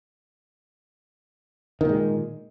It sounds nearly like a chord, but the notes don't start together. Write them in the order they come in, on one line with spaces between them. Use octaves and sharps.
D#3 A#2 G#3